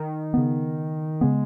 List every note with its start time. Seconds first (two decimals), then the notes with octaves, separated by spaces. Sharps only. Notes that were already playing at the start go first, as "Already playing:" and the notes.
Already playing: D#3
0.34 C#3 B3
1.21 C#3 G#3 B3